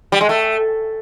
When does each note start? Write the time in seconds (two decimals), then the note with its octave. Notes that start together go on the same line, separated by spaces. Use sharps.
0.12 G3
0.21 G#3
0.29 A3